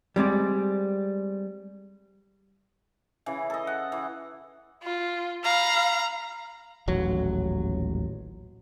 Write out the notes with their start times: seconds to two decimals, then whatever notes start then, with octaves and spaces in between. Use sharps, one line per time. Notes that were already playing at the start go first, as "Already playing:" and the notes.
0.16 G3 G#3 C4 D5
3.26 C#3 E3
3.50 A4 D#5
3.67 F#5
3.92 E3
4.83 F4
5.44 F5 A#5 B5
6.88 D#1 A1 F#3